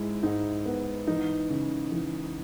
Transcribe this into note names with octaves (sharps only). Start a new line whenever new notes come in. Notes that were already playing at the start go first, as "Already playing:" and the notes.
Already playing: G#2 G#3 E4
G#2 D#4
B3
E3 D#4
C#3
E3